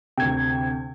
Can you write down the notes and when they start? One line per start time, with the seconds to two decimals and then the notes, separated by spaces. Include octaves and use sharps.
0.18 D2 C3 G5 G#6